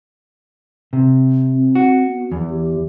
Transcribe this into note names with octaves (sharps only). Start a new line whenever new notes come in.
C3
C4
F#4
B3
E2 E3
G4